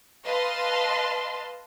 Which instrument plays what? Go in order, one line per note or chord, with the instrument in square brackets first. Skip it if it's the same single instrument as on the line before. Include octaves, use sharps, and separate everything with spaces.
[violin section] B4 D#5 F5 A5 C6